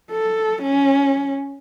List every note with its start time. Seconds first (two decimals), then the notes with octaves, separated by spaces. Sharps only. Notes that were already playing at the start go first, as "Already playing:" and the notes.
0.12 A4
0.62 C#4